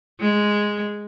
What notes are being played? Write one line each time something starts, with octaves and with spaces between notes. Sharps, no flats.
G#3